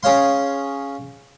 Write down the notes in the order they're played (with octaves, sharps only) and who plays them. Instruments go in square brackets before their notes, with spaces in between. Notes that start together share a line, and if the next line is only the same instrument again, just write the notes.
[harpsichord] C#4 G#4 C#5 F5 C6